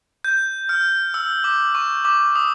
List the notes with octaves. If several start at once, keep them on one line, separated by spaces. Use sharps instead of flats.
G6
F6
E6
D6
C#6
D6
D#6